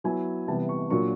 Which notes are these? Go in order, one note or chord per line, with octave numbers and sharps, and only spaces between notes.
F#3 B3 E4 G#5
C3 E3 G3 B3 A5
C#6
A#2 F#3 A#3 D4 F4 C#6